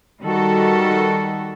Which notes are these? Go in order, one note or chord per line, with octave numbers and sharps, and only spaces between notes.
D#3 G3 F#4 A4